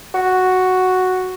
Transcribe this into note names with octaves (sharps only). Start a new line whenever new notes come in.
F#4